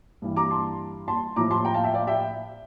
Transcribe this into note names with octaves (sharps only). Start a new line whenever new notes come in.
G2 E3 G3
A#5 D6
A5 C6
A5 C6
A2 F3 A#5 D6
A5 C6
G5 A#5
F5 A5
E5 G5
D5 F5
E5 G5